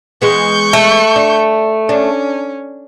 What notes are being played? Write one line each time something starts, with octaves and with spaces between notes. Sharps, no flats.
E3 G#3 B3 C#6 G6
A3
D4
C#4 D4